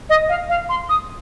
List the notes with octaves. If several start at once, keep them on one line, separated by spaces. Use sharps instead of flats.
D#5
F5
F5
C6
D#6